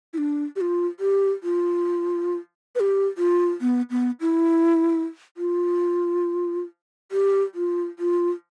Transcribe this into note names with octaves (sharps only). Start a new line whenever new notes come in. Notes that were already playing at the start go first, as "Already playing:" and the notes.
E4
D4
G4
F4
G4
F4
B4
G4
F4
B3
B3
E4
F4
G4
F4
F4